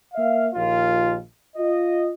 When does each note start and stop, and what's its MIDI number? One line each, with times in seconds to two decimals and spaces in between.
0.14 0.47 58
0.14 0.47 76
0.14 0.47 77
0.53 1.16 34
0.53 1.16 39
0.53 1.16 65
1.56 2.09 65
1.56 2.09 75